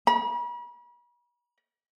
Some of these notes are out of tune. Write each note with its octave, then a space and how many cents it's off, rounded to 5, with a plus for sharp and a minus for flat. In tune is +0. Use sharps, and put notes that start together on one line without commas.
B5 -45